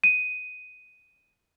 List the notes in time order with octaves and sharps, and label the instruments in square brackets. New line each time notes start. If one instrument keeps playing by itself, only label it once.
[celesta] D#7